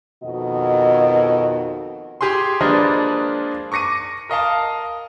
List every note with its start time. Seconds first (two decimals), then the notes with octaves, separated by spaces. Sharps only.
0.23 F2 B2 D#3 F#4 D#5
2.21 G4 G#4 G#5 C6
2.61 F3 G#3 A#3 D4 B4 D#5
3.72 C#6 D6 A#6 C#7 D#7
4.29 A#4 D#5 F5 A5